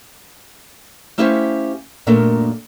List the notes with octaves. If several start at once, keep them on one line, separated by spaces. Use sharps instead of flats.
A3 C#4 E4 G4 C5 F5
F#2 A#2 A3 A#3 D4